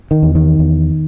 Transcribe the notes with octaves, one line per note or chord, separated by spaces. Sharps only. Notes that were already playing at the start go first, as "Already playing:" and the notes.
D#3
E2
D#3
E2